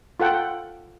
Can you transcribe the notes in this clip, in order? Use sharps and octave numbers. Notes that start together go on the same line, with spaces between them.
F4 A4 F#5 G5